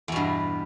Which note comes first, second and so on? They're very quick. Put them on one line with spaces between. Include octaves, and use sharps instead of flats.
E2 B2 G2